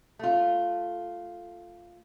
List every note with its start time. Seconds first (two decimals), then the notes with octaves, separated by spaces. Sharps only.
0.19 A3 F4